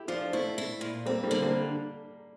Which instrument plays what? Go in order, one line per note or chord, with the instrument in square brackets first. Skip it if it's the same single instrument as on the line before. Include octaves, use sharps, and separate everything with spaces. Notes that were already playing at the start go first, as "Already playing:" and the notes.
Already playing: [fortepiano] E4 G4
[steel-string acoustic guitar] F3 [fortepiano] D4 F4
[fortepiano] A3 C4 [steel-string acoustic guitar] E4
[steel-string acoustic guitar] E4
A#2
[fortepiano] G3 A#3 [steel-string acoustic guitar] C4
[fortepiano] G3 A#3
[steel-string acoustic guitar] D3
[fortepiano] G3 A#3